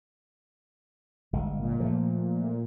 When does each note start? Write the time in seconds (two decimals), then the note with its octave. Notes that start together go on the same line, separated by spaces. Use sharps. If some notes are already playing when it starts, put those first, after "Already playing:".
1.33 G1 G#3
1.59 A#2
1.80 F3 A3